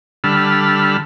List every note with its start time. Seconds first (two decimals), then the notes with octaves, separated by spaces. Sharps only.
0.24 D3 G3 A5 B5 E6 F6